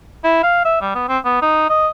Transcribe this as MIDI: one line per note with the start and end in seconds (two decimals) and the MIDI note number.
0.24 0.40 64
0.43 0.64 77
0.65 0.76 76
0.81 0.91 55
0.95 1.07 59
1.08 1.18 60
1.25 1.40 59
1.42 1.68 63
1.69 1.88 75